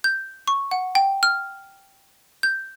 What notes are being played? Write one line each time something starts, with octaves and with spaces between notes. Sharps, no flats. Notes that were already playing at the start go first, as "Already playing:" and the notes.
G6
C#6
F#5
G5
F6
G6